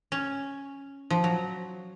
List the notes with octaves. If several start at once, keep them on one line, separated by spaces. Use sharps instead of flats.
C#4
F3
F#3